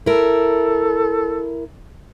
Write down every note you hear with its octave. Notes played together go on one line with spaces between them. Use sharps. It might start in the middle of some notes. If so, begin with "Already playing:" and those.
E4 A4 A#4